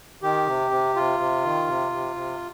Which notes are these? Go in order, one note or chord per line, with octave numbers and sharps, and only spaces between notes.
D#3 G4
C3
C3
C3 F4
C3
D#3
C3
C3
C3